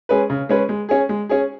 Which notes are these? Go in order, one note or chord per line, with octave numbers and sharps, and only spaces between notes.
G#3 C#4 G#4 B4
C#3
G#3 C#4 G#4 B4
G#3
C#4 G#4
G#3
C#4 G#4